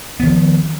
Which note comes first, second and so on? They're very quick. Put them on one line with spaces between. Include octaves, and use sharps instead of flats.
B3 D#3 F3